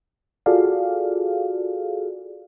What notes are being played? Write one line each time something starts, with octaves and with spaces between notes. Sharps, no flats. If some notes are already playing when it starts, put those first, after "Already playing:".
F4 F#4 G#4 A4 D5 F5